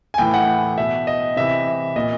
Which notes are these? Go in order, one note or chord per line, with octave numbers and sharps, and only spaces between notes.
G#5
A2 E3 G5
F#5
B2 E5
D#5
C3 E3 E5
A#2 D#5